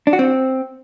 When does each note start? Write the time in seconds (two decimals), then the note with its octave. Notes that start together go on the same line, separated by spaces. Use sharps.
0.07 D4
0.13 F#4
0.19 C4